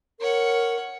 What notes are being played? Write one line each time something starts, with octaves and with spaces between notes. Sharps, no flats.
A#4 C#5 F#5